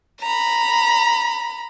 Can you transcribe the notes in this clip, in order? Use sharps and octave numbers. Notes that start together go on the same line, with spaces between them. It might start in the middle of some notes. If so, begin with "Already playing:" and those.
A#5 B5